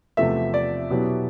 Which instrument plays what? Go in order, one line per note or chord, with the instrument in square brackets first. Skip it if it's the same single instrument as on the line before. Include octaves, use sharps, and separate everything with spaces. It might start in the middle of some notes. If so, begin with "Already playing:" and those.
[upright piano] E2 C3 F3 A3 [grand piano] E5
[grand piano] D5
[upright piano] B2 F#3 B3 E4 G4